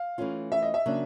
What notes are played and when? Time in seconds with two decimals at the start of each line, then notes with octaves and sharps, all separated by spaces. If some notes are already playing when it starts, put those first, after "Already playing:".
Already playing: F5
0.18 E3 A3 C#4 F4
0.52 E5
0.62 D#5
0.74 E5
0.86 C#3 F#3 A#3 D4